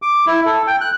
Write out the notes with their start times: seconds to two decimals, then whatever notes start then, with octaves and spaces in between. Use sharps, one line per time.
0.02 D6
0.27 E4
0.45 A4
0.67 G5
0.81 F#6